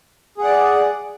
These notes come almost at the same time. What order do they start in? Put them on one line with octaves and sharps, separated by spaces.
G#4 F#5 D5